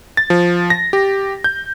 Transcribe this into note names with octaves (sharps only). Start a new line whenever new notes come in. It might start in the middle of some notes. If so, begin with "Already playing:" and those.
A6
F3
A#6
G4
G6